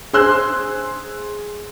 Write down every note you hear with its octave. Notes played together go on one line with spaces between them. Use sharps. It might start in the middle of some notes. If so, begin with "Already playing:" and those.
G#4 C5 C6 E6 F#6